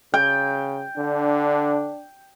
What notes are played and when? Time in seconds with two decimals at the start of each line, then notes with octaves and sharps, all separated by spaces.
0.14 C#3 G5
0.97 D3 D4